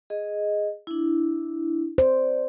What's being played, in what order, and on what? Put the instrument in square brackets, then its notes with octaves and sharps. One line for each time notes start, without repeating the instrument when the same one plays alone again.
[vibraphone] G#4 D#5
D4 E4
[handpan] C5 [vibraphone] D5